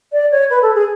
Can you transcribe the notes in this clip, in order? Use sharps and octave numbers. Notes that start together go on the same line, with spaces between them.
D5
C#5
B4
A4
G#4